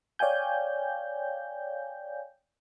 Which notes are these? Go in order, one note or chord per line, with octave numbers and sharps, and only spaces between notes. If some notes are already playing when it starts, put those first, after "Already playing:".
C#5 D5 F5 G5 G#5 G6